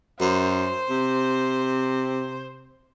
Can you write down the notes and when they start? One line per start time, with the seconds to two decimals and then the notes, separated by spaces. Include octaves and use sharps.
0.20 F#2 C5
0.90 C3